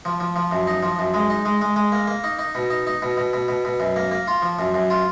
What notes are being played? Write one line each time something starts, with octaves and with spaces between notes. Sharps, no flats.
F3
F3
F3
F#2
D#4
F3
F#2
G#3
D#4
G#3
G#3
G#3
A#3
A#3
D#4
D#4
B2
D#4
D#4
B2
B2
B2
B2
B2
F#2
A#3
A#3
F4
F3
F#2
F#2
F4